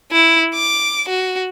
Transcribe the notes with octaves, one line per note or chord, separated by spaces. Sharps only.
E4
D6
F#4